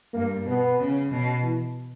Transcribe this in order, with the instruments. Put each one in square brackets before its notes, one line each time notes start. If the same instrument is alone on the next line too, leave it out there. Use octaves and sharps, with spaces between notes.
[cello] G2 [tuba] A#3
[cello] B2 [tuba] B3
[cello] C#3
B2
[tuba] E3